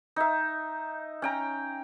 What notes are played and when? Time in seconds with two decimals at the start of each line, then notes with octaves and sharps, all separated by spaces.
0.16 D#4 E5
1.22 C#4 G5 A#5